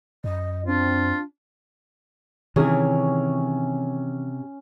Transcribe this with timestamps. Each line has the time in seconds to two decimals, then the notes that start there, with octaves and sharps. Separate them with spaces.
0.24 F#2 D#5
0.66 C4 D4 F4
2.56 C3 D#3 E3 C#4 G#4